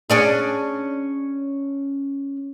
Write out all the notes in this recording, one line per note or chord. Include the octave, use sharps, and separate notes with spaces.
C#4 D4 G#4